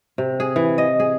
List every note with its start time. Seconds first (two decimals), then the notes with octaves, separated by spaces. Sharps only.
0.18 C3
0.40 G#4
0.56 E3
0.78 D#5
1.00 G#4